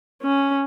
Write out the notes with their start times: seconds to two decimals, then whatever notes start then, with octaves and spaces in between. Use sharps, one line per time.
0.22 C#4